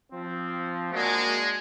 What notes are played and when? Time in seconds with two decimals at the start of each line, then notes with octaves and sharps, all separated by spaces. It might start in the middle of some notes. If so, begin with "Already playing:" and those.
0.12 F3 C4
0.92 G#3 A#3 D4 F#4